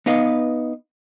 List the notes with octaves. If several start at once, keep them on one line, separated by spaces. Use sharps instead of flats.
B3 D#4 B4 F5